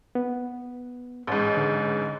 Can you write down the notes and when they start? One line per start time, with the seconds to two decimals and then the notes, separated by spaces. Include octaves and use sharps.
0.15 B3
1.27 A1 G#2
1.57 D3